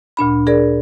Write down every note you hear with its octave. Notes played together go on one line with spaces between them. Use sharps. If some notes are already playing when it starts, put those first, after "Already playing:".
D2 A#2 D4 B5
G#4 A#4 D5